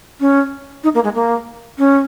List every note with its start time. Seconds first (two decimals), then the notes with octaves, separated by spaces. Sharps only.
0.20 C#4
0.84 D#4
0.95 A#3
1.04 G#3
1.15 A#3
1.78 C#4